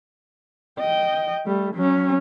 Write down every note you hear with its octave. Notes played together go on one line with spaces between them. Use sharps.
D#5 G5
G3 A3
F#3 C#4